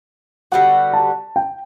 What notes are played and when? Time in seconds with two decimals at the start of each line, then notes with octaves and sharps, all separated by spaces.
0.52 D3 G3 B3 F#4 F#5
0.93 A5
1.36 G5